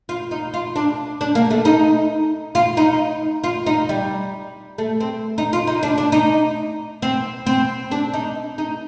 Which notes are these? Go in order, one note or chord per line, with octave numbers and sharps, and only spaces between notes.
F4
D#4
F4
D4
D4
A#3
A3
D#4
F4
D#4
F4
D#4
G3
A3
C4
D#4
F4
D#4
D4
D4
D#4
C4
C4
D4
D#4
D#4